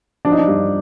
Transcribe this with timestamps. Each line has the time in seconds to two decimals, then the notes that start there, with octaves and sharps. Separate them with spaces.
0.25 F3 D4
0.32 D#4
0.39 D4
0.48 G2